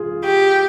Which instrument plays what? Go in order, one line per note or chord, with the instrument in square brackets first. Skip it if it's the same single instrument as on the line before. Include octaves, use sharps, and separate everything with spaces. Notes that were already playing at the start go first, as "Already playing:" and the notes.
Already playing: [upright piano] F4 G#4
[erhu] G4